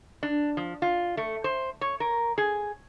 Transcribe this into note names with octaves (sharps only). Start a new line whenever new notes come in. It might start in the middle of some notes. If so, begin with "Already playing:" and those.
D4
F3
F4
A3
C5
C#5
A#4
G#4